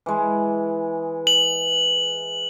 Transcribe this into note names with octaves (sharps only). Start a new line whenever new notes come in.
E3 G#3
F#7